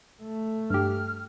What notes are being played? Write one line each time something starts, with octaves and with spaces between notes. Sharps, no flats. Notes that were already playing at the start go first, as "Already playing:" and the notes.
A3
G2 G4 F6